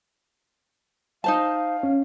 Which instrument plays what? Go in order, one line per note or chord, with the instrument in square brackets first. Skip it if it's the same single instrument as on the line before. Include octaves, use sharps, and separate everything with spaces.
[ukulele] D#4 C5 A5 [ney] F5
[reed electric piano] C#4